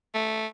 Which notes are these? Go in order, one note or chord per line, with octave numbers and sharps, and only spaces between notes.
A3